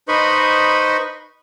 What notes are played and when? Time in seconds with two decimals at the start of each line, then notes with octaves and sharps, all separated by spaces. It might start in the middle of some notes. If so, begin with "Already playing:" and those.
0.08 D#4 B4 C5 D#5 B5 C#6